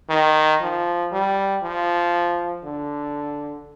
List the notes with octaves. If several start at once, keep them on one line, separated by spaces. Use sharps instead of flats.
D#3
F3
G3
F3
D3